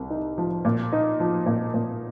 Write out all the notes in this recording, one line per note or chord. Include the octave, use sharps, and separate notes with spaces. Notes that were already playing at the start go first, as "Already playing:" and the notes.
Already playing: C2
D#4
F3
A#2
D#4
F3
A#2
A#2